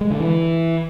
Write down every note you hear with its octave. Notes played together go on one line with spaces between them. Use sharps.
G#3
D3
E3